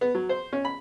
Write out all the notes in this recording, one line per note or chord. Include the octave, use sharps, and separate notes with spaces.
B3
F#3
C5
C#4
B5